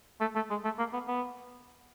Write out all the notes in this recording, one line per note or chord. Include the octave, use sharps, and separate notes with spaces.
A3
A3
G#3
A3
A#3
B3
B3